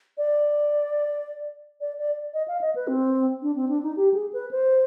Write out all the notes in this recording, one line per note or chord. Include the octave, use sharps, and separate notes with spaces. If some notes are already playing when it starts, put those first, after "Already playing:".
D5
D5
D5
D#5
F5
D#5
B4
C4
D4
C4
D4
D#4
G4
G#4
B4
C5